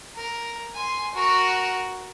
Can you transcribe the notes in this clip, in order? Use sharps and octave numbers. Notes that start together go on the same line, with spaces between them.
A#4
G#5 C6
F#4 A#4